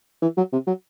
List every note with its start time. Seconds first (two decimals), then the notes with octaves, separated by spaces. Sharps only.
0.22 E3
0.37 F#3
0.52 C3
0.67 F#3